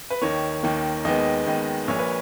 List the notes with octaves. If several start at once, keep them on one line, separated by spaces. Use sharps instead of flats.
B4
D#2 D#3 A#3 C#5
D#2 D#3 A#3
D#2 D#3 G#3 B3 D#5
D#2 D#3 G#3 B3
A#1 A#2 A#3 C#5
B4